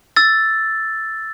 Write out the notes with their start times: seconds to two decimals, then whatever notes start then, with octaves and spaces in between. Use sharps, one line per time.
0.16 E6 A6